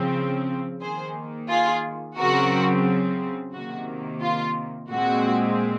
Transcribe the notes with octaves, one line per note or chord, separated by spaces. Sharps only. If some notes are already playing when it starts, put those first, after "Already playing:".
Already playing: C#3 F3 C4
D#3 A#3 G#4 C5
F4 G#4
C#3 F#3 C4 F#4 A#4
C3 D#3 A#3 F#4
F4
A#2 G#3 C4 F#4